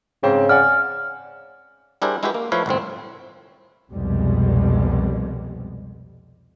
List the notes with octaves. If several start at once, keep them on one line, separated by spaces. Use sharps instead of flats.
G#2 C#3 C4 G5
D5 F#5 G#5 F6
G3 D4 E4 G#4 A#4 C5
G#3 E4 F#4 G4 B4
A#3
F3 A3 E4 B4 C#5 F5
G1 C2 A2 C4
C2 F2 B2 G3 G#3